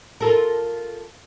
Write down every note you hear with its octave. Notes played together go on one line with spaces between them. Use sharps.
F4 A4 A#4